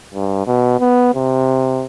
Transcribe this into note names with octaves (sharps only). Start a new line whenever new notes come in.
G2
B2
B3
C3